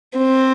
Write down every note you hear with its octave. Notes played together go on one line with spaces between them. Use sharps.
C4